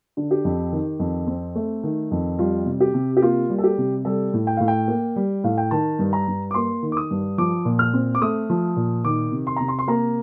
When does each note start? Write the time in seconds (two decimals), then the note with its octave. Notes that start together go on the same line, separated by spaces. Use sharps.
0.17 D3
0.31 G4
0.45 F2
0.72 D#3
0.99 F2
1.27 C4
1.55 A3
1.83 D#3
2.11 F2
2.39 G3 F4
2.66 C3
2.80 G4
2.94 C3
3.17 G4
3.22 A#3 F4
3.50 G3
3.58 A4
3.64 G4
3.78 C3
4.05 G3 A4
4.34 A2
4.47 G5
4.57 A2 F5
4.68 G5
4.88 A#3
5.16 G3
5.44 A2 F5
5.57 G5
5.71 D#3 A5
5.99 G2
6.13 A#5
6.28 G2
6.51 D6
6.54 A#3 C6
6.83 D#3
6.92 D6
6.97 D#6
7.11 G2
7.38 F3 D6
7.65 A#2
7.79 F6
7.94 C4
8.15 D6
8.22 A3 D#6
8.50 F3
8.76 A#2
9.04 D#3 D6
9.32 C3
9.47 C6
9.56 C3 A#5
9.68 C6
9.79 C6
9.88 A#3 A#5